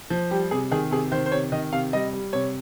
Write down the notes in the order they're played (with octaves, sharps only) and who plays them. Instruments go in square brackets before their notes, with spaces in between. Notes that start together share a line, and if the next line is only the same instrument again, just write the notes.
[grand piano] F3
G3 G4
C3 G#4
D#3 G#4
C3 G#4
D#3 C5
C5
C3 C#5
D#3 D#5
C3 F5
G3 D#5
G3
C3 C#5